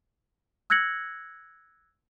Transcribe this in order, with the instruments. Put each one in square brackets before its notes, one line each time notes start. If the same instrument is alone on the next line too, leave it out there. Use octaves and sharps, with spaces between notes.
[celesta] E6 F#6 G#6 A#6 C#7 F#7